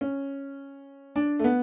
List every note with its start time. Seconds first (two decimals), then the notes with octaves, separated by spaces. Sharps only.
0.01 C#4
1.16 D4
1.39 A3
1.44 B3